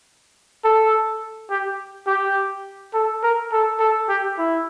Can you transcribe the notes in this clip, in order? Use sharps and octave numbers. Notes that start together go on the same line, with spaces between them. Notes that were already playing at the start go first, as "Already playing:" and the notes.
A4
G4
G4
A4
A#4
A4
A4
G4
E4